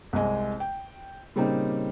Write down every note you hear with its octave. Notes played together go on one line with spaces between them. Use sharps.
C2 C3 G#3 D#5 G#5
G5
A#2 C#3 G3 A#3 C4 D#4